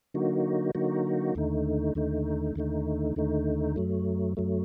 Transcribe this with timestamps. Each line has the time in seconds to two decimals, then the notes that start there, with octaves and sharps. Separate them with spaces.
0.14 D3 F#3 A#3 D#4 F#4
0.75 D3 F#3 A#3 D#4 F#4
1.35 D#2 D3 A3 D#4
1.95 D#2 D3 A3 D#4
2.56 D#2 D3 A3 D#4
3.16 D#2 D3 A3 D#4
3.76 F#2 F#3 A3
4.37 F#2 F#3 A3